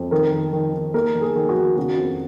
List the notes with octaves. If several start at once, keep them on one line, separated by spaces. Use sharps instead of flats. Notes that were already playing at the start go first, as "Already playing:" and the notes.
Already playing: F2
D#3 A#4
D#3
D#3
D#3
D#2 A#4
D#3
G#4
D#3
F#4
D#3
C#3 F#4
F2